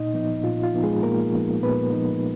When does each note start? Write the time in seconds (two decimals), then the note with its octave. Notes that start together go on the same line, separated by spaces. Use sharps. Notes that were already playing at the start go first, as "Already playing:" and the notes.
Already playing: A#2 D#4 D#5
0.14 F3 B3 D#4
0.43 A#2 F4
0.64 F4
0.73 F3 B3 D#4
0.83 G#3 G#4
1.03 A#2 A#3 A#4
1.33 F3 B3 D#4
1.63 A#2 B3 B4
1.93 F3 B3 D#4